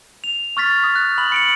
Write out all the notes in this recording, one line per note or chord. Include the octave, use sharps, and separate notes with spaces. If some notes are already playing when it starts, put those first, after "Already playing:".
F7
C#6 F6 A6 B6
D#6
F#6
B5 F#7
C#7 D7 F#7